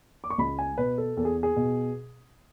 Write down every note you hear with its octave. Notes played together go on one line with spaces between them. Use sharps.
D6
C#6
C#2 B5
G#5
B2 B4
A4
E2 A4
G#4
G#4
B2